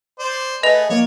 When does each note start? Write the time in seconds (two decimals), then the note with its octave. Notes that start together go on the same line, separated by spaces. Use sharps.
0.19 C5 D5
0.63 A3 G#4 B4 D#5 F7
0.90 F3 A#3 C#5 D5